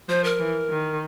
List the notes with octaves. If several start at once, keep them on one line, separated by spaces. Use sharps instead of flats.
F3 C5
A#4
E3
D#3